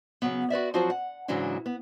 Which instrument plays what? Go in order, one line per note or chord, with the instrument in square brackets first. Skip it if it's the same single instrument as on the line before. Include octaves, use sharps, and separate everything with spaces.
[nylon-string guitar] C#3 F#3 B3
F#4 B4 D5 E5
F3 F#3 C4 F4 F#4
F#5
G#2 C#3 E3 F#3 G#3 D4
B3